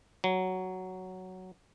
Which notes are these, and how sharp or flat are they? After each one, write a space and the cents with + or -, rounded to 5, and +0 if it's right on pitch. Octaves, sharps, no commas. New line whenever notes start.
F#3 +5